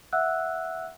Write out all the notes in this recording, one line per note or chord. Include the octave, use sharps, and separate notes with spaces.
E5 F#5 E6 F#6